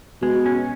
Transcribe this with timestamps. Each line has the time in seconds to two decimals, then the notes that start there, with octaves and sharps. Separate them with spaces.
0.22 B2 G#3
0.46 C#4